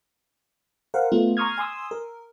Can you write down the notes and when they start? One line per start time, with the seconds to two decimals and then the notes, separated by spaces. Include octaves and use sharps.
0.94 A#4 C5 F5 F#5
1.12 A3 B3 F4
1.37 A#5 C6 C#6 D#6 F6 G#6
1.58 G#5 C6 D#6 E6
1.91 A#4